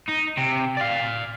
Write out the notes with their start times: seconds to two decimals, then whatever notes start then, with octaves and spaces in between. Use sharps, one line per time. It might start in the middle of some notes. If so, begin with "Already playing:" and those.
0.09 D#4
0.38 C3
0.77 D5 F5